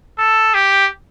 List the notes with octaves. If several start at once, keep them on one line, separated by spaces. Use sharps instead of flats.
A4
G4